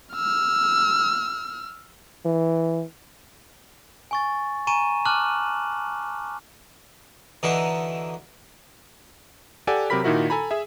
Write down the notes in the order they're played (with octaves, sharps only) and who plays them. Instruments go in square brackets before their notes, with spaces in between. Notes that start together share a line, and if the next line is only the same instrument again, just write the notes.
[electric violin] E6 F6
[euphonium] E3
[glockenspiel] G#5 C#6 A6
G#5 A#5 C#6 D#7 E7
A5 D6 F6 F#6 F#7
[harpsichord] D3 E3 D#4 F#4
[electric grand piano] G4 A4 D5 F#5 G#5
C3 F#3 G4 A#4 B5 B6
A#2 D#3 D#4 E4 F#4 A#4
A4 G#5 A#5 B5
G#4 E5